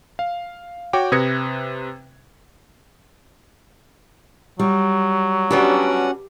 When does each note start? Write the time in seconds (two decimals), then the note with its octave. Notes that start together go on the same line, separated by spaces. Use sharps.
0.19 F5
0.93 F#4 C#5 G5 D6
1.12 C3 B4 D#6 G#6 A#6 C#7
4.60 F#3 G3
5.51 G3 B3 C#4 D4 F#4 G4 F#5